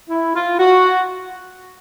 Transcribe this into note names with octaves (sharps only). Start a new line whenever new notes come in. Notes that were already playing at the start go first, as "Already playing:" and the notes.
E4
F4
F#4